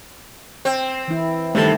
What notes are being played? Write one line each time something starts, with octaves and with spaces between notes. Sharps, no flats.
C4
E3 E4
G2 C3 D#3 A3 A4